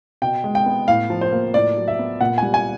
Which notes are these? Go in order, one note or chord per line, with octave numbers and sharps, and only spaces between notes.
B2 G5
G#3
G5
B3
A2 F5
F3
C5
A#3
A2 D5
F#3
E5
B3
A#2 F#5
G3 G#5
G#5